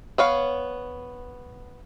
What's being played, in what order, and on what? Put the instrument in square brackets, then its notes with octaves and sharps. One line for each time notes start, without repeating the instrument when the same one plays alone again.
[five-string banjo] B3 C#5 F5